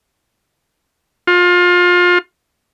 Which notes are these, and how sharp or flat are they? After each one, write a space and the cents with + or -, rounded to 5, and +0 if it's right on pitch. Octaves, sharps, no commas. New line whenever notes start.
F4 +25